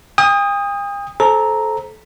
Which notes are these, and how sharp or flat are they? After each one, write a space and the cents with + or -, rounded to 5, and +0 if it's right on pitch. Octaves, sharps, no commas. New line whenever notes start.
G5 +45 D#6 +0
A4 -25 C5 +0 A#5 +0